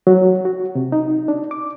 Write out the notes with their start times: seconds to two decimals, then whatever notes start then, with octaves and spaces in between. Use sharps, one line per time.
0.07 F#3
0.45 F#4
0.75 C3
0.92 D#4
1.28 D4
1.51 D6